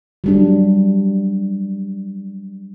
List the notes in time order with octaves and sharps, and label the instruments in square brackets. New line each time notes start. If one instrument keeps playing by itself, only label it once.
[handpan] F#3 G3 D4